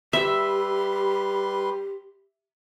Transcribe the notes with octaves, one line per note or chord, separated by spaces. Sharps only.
G3 G4 B4 E5 C6